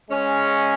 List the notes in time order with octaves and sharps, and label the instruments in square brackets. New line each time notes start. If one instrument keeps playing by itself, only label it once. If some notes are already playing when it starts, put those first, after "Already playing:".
[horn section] C#3 G#3 C#4